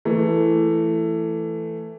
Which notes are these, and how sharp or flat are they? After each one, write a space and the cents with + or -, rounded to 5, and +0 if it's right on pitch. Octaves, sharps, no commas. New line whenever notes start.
E3 +10 A3 +10